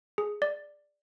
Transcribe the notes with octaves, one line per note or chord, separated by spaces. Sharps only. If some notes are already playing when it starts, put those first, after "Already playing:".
G#4
D5